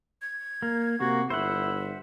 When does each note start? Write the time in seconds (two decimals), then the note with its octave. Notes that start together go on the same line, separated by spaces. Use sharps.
0.22 G#6
0.62 A#3
1.00 C3 A#3 F#4
1.30 G1 E4 C5 E5 F#5